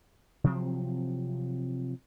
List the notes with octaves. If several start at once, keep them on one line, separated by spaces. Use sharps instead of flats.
C3 F3 F#3 C4